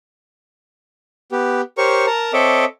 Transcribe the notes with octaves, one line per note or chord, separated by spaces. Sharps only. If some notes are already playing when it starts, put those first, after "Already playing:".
B3 G4
G4 A#4 C5 C#5 C#6
A#4 A5 A#5
C4 A4 C#5 D#5 E5 D6